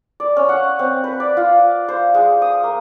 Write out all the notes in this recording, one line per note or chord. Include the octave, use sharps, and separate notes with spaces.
D5
C#4
F#5
C4
B4
D5
F4
C5
G#3
D#6
A#3